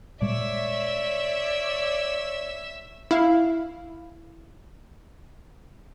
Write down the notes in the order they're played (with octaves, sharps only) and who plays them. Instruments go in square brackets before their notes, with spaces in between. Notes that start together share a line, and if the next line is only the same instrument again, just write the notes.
[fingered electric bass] A#2 G3 G#3 [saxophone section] C#5 D5 [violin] E5 E6
[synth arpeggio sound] E4 F5